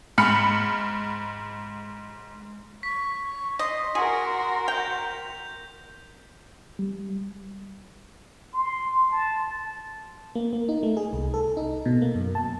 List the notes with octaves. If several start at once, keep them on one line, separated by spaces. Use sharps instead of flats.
G#2 B5 F6 C#7
C#6 B6
D#5 C6 A#6
F#4 G#4 A#4
G5 G6 F7
G3
C6
A5
A#3
A#3
D#4
A3
G#4
C2
A4
D#4
B2
A#3
F#2
A5